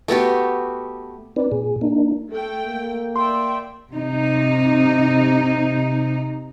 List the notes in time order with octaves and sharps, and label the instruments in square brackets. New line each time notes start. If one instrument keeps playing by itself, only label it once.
[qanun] A3 B3 F#4 G4
[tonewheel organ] C4 D#4 B4 D5
A#2 G#4
A#3 D4 D#4
[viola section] A3 G5 [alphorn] A4
[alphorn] A#3
[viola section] D5 E5 G5 [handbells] C6
[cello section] C3 D#4